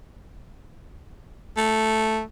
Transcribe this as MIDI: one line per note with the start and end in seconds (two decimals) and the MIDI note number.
1.57 2.22 57